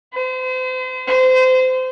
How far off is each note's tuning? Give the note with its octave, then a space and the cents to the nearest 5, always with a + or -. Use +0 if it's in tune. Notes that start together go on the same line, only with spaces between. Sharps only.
C5 -35
C5 -25